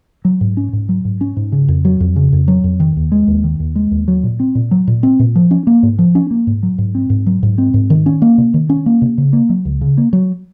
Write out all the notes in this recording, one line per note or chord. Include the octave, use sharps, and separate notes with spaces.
F#3
G#2
C#4
G#2
F#3
G#2
C#4
G#2
C#3
F2
F#3
F2
C#3
F2
F#3
F2
D#3
D#2
G#3
D#2
D#3
D#2
G#3
D#2
F#3
A#2
C4
A#2
F#3
A#2
C4
A#2
F3
C#4
A#3
G#2
F3
C#4
A#3
G#2
F#3
G#2
C4
G#2
F#3
G#2
C4
G#2
D#3
C#4
A#3
C3
D#3
C#4
A#3
C3
C#3
A#3
F#3
C#2
C#3
A#3
F#3